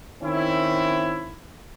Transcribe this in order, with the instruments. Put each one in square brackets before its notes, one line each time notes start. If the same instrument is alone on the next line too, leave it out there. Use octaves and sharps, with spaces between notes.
[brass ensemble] D#3 C4 C#4 E4